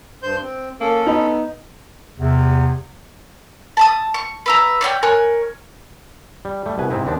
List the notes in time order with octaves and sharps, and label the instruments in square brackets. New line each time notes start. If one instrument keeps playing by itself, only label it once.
[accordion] G2 C5 G6
C4
[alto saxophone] A#3 [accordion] C#4 A4
[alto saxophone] B3 [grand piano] D#4 B5
[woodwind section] E2 C3
[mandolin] A5 B5 D#6
C#6
B4 E5 A#5
C#5 D5 F5 G5
A#4 C#5 G#5 F#6
[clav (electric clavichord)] G3
G3 A3
C2 B2 B4 G#5
G#2 C3 C4 D#4 E4
D#2 B3 C4 D4